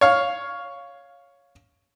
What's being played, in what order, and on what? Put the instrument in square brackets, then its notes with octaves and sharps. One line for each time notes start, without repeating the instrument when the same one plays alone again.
[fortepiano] C#5 F5